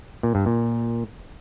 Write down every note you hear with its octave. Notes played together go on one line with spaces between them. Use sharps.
A#2
G2
A#2